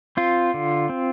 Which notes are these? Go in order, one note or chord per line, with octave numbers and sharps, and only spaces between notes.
C4 F4
D3
C4